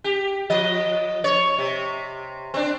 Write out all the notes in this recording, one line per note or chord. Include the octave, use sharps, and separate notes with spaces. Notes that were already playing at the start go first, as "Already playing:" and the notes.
G4
F3 D#5
C#5
C3
C4 D4